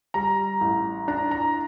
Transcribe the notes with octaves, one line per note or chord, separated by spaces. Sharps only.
G3 A#5
A1
D4 A#5
A#5